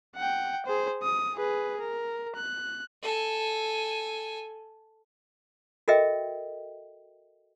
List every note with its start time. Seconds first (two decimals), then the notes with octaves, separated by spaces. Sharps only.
0.16 F#5 G5
0.66 G#4 C5
1.03 D#6
1.36 G#4 B4
1.80 A#4
2.36 F#6
3.03 A4 G#5
5.88 F#4 A4 A#4 D#5 E5 G5